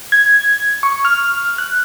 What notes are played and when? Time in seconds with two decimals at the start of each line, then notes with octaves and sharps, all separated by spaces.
0.12 G#6
0.83 C#6
1.05 F6
1.58 F#6